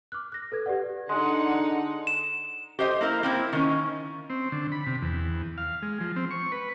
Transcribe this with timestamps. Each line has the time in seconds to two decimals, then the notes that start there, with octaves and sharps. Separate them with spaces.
0.12 D6 F6 F#6
0.32 F#6 A#6
0.52 A4 B4 G#6
0.66 G4 B4 D5 F#5
1.09 D3 G#3 D#4 F#5
2.07 E7
2.79 G4 C5 D#5
3.01 A#3 E4 A#4
3.23 A#3 C4 E4
3.53 D#3 C#4
4.30 C4
4.52 D3
4.72 B5
4.87 C3
5.02 E2
5.58 F5
5.82 G#3
6.01 F3
6.16 C4
6.31 C#6
6.52 B4